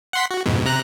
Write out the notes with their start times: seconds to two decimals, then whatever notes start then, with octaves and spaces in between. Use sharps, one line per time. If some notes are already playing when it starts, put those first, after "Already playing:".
0.13 F#5 C6 B6
0.31 F#4
0.46 F2 G#2 B2
0.66 C3 A#5 F#6